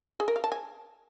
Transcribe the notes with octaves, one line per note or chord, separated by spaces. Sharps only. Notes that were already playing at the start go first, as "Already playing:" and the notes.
G#4
A#4
F5
A5
G#5